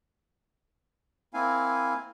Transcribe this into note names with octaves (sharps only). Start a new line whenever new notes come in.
A#3 C4 E4 F5 G#5